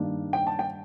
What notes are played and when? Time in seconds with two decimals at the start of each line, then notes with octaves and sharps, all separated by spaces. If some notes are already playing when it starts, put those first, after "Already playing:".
Already playing: G2 D#3 A#3 D4
0.33 G5
0.47 A5
0.59 G5